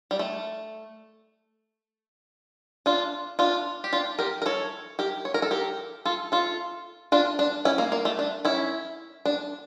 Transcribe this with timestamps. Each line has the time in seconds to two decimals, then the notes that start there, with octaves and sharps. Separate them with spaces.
0.11 G3
0.19 A3
2.86 D4 F4
3.39 D4 F4
3.84 G4
3.93 D4 F4
4.19 G4 A#4
4.42 A#4
4.46 A4 C#5
4.99 G4 A#4
5.25 C#5
5.34 A#4
5.42 A4
5.51 G4 A#4
6.05 F4 A4
6.32 F4 A4
7.12 D4 F4
7.39 D4
7.65 C#4 E4
7.78 A#3
7.92 A#3
8.05 A3
8.19 D4
8.45 C#4 E4
9.25 D4